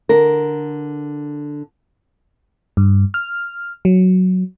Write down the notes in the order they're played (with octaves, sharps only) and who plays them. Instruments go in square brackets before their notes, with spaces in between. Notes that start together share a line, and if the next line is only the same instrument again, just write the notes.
[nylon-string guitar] D3 A#4
[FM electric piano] G2
F6
F#3